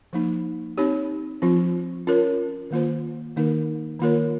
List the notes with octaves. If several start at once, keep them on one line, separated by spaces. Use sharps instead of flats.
F3 A#3 D#4
C4 D#4 G4 C#5
F3 C4 F4
C#4 F4 A#4 C#5
D#3 A#3 F4 C5
D#3 A#3 D#4 A#4
D#3 A#3 F4 A#4 C#5